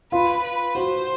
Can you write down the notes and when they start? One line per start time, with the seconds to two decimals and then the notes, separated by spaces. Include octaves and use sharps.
0.12 F4 B4
0.43 B4
0.75 F#4 C5